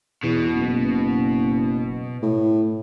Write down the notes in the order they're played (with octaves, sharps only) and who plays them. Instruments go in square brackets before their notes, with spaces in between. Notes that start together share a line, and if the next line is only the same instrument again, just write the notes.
[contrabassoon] E2 [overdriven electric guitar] B2
[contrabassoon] F#1
A2